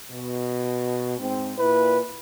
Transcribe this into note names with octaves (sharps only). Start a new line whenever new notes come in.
B2
G#2 C4
A#2 E4 B4